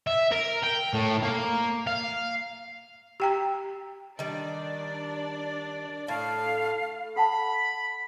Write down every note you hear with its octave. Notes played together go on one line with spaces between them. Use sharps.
E5
A#4
G5
A2
A#3
F5
G4 G5 A#5
D#3 G3 D4 D5
A2 F5
A4 F#5 A5 B5